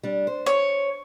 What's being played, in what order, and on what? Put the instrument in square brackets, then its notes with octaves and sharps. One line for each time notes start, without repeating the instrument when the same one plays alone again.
[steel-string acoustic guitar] G3 D4
C5
[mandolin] C#5